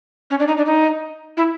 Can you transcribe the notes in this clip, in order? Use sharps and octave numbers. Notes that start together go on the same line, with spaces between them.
C#4
D4
D#4
D4
D#4
E4